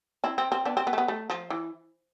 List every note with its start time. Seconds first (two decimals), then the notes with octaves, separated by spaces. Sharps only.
0.24 C4 E4
0.38 C4
0.52 C4
0.65 B3 D4
0.77 C4
0.87 B3
0.93 A3
0.98 B3
1.08 A3
1.30 F3
1.50 E3